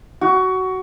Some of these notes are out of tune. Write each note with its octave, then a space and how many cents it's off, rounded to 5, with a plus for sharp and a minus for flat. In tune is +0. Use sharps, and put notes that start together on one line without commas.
F#4 +15